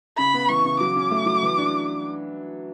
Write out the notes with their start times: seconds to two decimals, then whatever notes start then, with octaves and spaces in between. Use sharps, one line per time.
0.18 C#3 B5
0.34 B3
0.49 E3 C#6
0.65 C#3
0.80 F#3 D6
0.96 C#4
1.11 A3
1.26 F#3
1.43 E3
1.58 D4